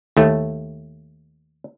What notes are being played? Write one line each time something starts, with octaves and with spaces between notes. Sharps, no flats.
D#2 A3